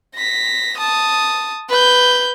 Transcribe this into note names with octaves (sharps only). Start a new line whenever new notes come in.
A#6 B6
A5 D#6
B4 G6